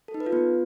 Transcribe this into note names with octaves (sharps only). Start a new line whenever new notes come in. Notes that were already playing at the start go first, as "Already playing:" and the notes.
A4
D#4
B4
F4
B3